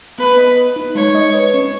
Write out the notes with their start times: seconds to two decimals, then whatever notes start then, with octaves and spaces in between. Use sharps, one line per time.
0.18 B3 B4
0.38 D#5
0.57 B4
0.76 D#4
0.95 G#3 C#5
1.15 D#5
1.34 B4
1.54 C#4